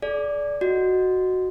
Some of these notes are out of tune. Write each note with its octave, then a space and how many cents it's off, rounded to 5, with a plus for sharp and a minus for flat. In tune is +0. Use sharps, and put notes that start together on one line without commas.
A4 -45 D5 -10
F#4 +0 D#5 -10